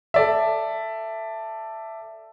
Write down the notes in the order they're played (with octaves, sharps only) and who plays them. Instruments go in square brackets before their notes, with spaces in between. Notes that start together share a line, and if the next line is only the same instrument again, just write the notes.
[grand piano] A4 D5 E5